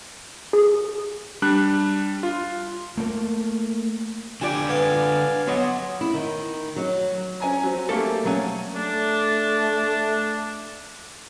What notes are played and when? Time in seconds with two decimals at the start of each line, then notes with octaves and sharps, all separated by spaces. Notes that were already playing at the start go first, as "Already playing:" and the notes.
0.53 G#4
1.42 G3 D4 F#6
2.23 F4
2.97 A3 A#3
4.41 D3 F4 G4 D5 G5 G#5
4.69 B3 D5 F5 G#5
5.47 F#3 B3 C#5 D#5 C6
6.01 E4
6.14 D#3
6.76 F#3
7.40 C#4 G#5 A#5
7.63 F#3 C4
7.89 A3 A#3 G4 A4 C#5
8.24 B1 F#3 C#4
8.75 A3 D4